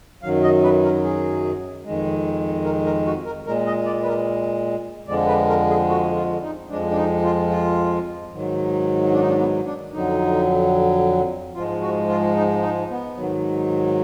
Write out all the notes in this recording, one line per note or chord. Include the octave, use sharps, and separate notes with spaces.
F#2 D#3 F#3 F5
D#5
B4
A#4
G#4
F2 D#3 G#3
A#4
A#4
F#4
A#4
A#2 G#3 A#4
D#5
D5
B4
A#4
F2 D3 F3 G#3 D5
B4
A#4
G#4
F#4
F4
D#4
F2 F3 G#3 D4
D4
D#4
F4
F4
G#2 D#3 F#3
D4
D#4
D4
B3
D4
F2 D3 F#3 D#4
G#2 F3 G#3 F4
F#4
F4
D#4
D#4
B3
G#2 D#3 F#3